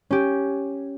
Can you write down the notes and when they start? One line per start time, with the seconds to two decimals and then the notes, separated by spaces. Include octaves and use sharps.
0.10 C#4 G4